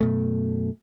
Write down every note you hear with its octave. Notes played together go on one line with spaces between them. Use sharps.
F#2 B2 A3